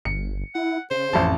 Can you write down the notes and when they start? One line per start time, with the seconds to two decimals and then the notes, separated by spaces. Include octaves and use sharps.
0.05 G1 C#7
0.55 E4 F#5
0.91 C#3 C5
1.13 A1 F2 A5